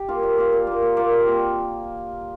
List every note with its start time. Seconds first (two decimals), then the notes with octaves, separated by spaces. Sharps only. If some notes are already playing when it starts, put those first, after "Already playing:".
Already playing: G4
0.08 A#3 F4
0.23 A#2
0.38 A#3 F4
0.53 A#2
0.67 A#3 F4
0.82 A#2
0.97 A#3 F4
1.11 G3
1.26 C4 F4